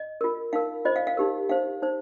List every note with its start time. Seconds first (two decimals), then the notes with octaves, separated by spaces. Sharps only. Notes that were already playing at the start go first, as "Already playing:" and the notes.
Already playing: D#5
0.21 F4 A#4
0.53 D#4 A#4 F5
0.85 F4 C5 D#5
0.96 F5
1.07 F5
1.17 D#4 G4 A#4
1.49 D#4 C5 F5
1.82 D#4 C5